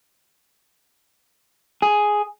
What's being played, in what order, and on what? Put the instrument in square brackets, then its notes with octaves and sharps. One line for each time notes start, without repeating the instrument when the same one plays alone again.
[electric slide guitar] G#4